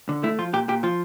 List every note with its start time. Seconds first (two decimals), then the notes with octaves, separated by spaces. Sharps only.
0.09 D3
0.23 A3 E4
0.39 F3 F4
0.53 A#2 G4
0.68 A#2 G4
0.83 F3 F4